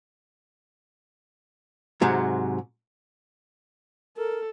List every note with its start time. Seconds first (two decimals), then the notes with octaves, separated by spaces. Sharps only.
2.01 G#2 C3 F#3 G#3
4.17 A4 A#4